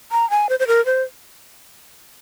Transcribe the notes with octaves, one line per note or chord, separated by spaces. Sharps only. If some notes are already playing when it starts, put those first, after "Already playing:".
A#5
G#5
C5
C5
A#4
C5